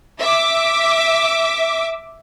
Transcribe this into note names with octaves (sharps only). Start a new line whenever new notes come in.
E5 D6